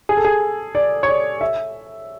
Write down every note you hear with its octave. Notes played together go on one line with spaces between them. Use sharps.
G#4
A4
G#4
D5
C#5
D5
E5